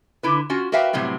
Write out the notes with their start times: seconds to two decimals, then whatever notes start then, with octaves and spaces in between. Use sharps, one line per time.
0.23 D3 E4 B4
0.50 C#4 F4 F#4
0.72 F#4 A#4 B4 E5 F5 G5
0.93 A2 C3 F#3 G3 B3